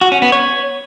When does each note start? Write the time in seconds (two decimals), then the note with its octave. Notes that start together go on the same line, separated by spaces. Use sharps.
0.01 F#4
0.12 C#4
0.22 B3
0.32 C#5